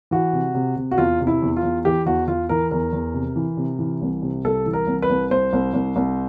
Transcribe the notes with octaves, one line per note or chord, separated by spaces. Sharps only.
E3 F#4
C3
C3
C3
F#4
E2 F4
C3
E4
E2
F4
E2
E3 G4
E2 F#4
E2 F4
E3 A#4
E2 A#4
E2
C3
E3
C3
E3
C2
C3
C2 A4
E3
A#4
C2
B4
C2
C2 C5
C2
C2
C2